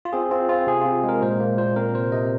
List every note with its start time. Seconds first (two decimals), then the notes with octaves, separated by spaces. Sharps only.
0.05 F4
0.13 C4 G#4
0.31 C4 F4
0.49 C4 F4
0.67 C3 G#4
0.81 C4 F4
1.04 G#3 A#4
1.22 A#2 C5
1.40 A#3
1.58 A#2 C5
1.76 C4 A#4
1.95 C3 C5
2.12 C3 D#5